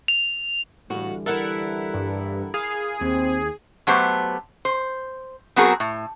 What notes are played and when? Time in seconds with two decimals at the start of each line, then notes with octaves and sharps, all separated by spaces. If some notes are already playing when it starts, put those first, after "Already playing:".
0.08 F7
0.90 A2 D3 E3 G3 F#4 F5
1.26 E4 A4 A#4 E5 F#5
1.94 G2
2.54 G#4 F5
3.01 D#2 C4
3.87 F#3 A3 B3 G4 C5
4.65 C5
5.56 F#3 B3 C4 F#4 G#4 A#4
5.80 A2